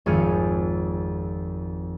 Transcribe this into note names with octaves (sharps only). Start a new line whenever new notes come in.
G#1 F2 G#4 F6 C#7